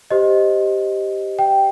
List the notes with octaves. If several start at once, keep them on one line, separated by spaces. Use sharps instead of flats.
G4 C5 D#5
G5